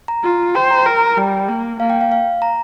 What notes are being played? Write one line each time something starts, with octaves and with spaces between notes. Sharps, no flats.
A#5
F4
C5 G5
A#5
A#4 A#5
G3 G5
A#3
A#3 F5
G5
F5
F5
A#5